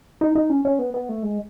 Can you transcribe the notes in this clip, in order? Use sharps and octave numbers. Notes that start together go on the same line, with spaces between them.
D#4
D#4
C#4
C#4
B3
B3
A3
G#3